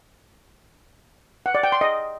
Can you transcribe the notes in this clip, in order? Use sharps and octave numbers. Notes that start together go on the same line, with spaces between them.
F#5
D5
G5
C6
D#5